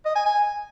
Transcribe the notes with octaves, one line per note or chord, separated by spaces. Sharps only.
D#5
G#5
G#5